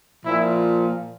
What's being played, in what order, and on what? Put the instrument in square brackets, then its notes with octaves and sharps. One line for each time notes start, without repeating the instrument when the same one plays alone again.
[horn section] A#2 F3 E4